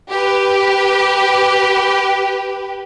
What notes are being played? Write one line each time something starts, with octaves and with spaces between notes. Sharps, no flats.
G4 B4